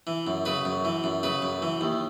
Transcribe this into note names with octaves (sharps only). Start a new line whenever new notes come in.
E3
F#2
C#3 B4
F#2
E3
F#2
C#3 B4
F#2
E3
D#2